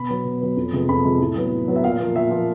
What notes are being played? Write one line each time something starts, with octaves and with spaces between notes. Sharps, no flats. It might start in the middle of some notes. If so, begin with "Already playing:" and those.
Already playing: B2 B5
F#3 B3
B2
F#3 B3
F2
C3 F3 G#3 B3
F2 B5
C3 F3 G#3 B3
A2
F#3 B3
A2
F#3 B3
E5
A#2 F5
F3 A#3
A#2 E5
F3 A#3